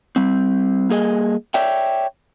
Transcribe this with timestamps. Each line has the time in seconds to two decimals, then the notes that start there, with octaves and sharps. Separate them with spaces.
0.16 G3 C4
0.89 G3 A#3 G#4 D#5
1.54 C#5 D5 E5 G5